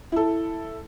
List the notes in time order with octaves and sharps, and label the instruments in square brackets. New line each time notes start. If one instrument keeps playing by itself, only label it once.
[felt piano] E4 A4